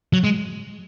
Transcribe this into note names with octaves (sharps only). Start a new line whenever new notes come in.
F#3
G#3